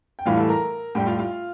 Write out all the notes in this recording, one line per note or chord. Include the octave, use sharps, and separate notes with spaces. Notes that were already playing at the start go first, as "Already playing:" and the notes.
G5
A2 E3 G3 F4 F5
A4 A5
A#4 A#5
A2 G3 G4 G5
F4 F5
F4 F5